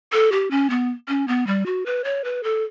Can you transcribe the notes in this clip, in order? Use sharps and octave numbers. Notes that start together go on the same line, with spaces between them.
A4
G4
C#4
B3
C#4
B3
G3
F#4
B4
C#5
B4
A4